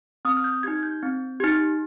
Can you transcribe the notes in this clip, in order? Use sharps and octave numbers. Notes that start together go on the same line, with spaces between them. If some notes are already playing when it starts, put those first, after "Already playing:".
C4 D#6
F6
G6
D#4 G4 G#6
G6
C4
D#4 G4